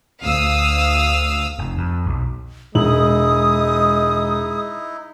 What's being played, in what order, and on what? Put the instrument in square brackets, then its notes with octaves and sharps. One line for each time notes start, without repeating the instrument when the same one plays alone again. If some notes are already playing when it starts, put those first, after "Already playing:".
[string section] D2 F5 D#6 E6
[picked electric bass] F1
F2
B1
[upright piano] E1 F#7 [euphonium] G#3 [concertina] D#4 E4 [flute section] D#6